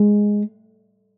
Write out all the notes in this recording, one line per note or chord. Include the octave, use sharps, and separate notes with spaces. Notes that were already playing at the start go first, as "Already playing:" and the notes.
Already playing: G#3